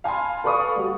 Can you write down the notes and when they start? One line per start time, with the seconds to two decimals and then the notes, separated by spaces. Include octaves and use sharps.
0.04 F5 G#5 A5 B5 C6
0.44 A4 B4 D5 F5 C#6 D#6
0.76 G3 F#4